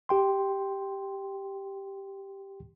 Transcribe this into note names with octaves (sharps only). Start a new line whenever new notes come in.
G4 G5 C6